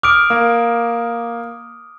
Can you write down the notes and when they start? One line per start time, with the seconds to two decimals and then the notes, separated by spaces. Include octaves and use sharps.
0.03 D6 D#6 F6 D7
0.30 A#3